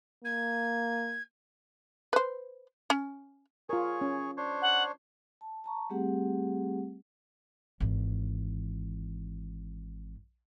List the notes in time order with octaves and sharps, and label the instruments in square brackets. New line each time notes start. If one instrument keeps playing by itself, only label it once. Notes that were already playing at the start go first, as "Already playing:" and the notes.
[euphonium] A#3 [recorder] G#6
[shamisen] B4 C5
C#4
[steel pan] F4 A#4 [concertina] G#4 C#5
[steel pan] C#4
[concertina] D4 C5 C#5
[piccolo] F#5
[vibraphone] A5
A5 A#5 C#6
G3 A3 C4 G4 G#4 F#5
[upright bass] G#1 E3